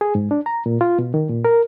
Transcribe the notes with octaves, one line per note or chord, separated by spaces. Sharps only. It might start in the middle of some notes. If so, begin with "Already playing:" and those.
G#4
G#2
D4
A#5
A#2
F4
B2
D#3
A#2
A#4